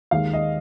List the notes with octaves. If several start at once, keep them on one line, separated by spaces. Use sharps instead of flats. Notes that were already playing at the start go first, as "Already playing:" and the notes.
D#2 D#3 G#3 F5
D#5